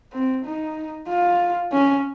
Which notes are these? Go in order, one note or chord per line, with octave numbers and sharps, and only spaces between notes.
C4
D#4
F4
C#4